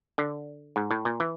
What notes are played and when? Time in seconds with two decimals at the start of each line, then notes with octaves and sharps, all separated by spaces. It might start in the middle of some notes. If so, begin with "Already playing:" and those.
0.18 D3
0.76 G#2
0.91 A2
1.05 A#2
1.20 E3